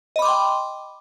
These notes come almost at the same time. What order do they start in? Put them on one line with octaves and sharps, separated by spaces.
D#5 B5 D6 C6 G5